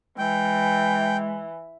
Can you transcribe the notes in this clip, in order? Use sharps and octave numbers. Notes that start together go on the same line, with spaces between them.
E3 G#3 G5